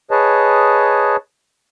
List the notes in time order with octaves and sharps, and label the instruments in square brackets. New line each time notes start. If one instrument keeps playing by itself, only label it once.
[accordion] G#4 B4 C#5 D#5 A5